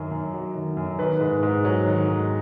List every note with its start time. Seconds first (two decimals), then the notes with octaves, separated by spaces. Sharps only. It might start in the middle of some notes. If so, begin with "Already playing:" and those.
Already playing: F#2 D#3
0.11 F#2
0.34 F#3
0.55 D#3
0.77 F#2
0.99 D#3 B4
1.21 G#2
1.43 G#2
1.65 F#3
1.87 D#3
2.09 G#2